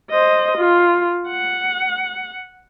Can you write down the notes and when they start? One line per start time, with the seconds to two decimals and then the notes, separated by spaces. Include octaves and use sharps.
0.11 C5 D#5
0.58 F4
1.28 F#5